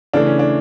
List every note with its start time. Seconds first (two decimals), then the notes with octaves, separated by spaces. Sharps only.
0.14 C#3 E3 A3 D4
0.26 C#4
0.39 D4